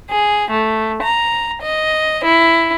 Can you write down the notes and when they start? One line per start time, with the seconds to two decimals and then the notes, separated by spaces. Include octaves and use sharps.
0.11 G#4
0.51 A3
1.03 A#5
1.63 D#5
2.24 E4